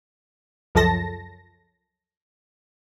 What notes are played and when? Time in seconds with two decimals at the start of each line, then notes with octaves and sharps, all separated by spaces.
0.75 C#2 F#2 F3 A4 A5 A#6